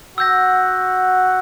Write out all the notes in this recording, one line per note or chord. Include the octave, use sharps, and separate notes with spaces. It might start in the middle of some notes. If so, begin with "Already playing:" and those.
F#4 F#5 E6 G6 A#6